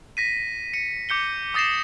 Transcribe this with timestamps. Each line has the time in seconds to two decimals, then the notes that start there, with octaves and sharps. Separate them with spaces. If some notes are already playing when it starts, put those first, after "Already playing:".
0.17 A#6 B6 D#7
0.73 C#7 D#7
1.09 D6 G6 C#7 G7
1.54 D6 D#6 A6 A#6 C7 E7